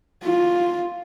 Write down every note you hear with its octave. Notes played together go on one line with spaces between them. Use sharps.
F4